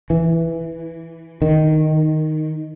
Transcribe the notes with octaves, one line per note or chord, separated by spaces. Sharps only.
E3
D#3